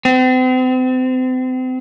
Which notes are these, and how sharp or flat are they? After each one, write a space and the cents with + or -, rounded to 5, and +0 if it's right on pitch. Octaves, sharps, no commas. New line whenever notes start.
C4 -40